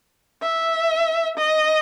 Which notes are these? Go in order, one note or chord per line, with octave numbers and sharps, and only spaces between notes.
E5
D#5